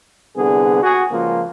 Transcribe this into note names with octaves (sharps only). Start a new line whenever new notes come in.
C2 D3 B3 G#4
F#4 G#4
C#2 F3 A#3 F4